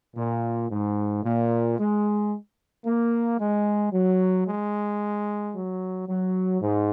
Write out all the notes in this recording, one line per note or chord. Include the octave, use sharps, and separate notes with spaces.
A#2
G#2
A#2
G#3
A#3
G#3
F#3
G#3
F#3
F#3
G#2